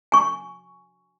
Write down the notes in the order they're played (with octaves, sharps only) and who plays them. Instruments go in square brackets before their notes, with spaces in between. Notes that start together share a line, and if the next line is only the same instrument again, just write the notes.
[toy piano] G#5 C#6